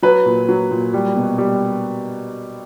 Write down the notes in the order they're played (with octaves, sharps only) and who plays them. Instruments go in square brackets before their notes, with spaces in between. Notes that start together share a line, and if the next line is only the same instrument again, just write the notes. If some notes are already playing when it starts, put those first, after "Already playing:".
[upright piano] F#3 B4
A#2
F#3
A#2
G3
B2
G3